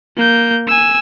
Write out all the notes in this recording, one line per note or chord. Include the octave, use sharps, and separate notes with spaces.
A#3 G6
G#5 E6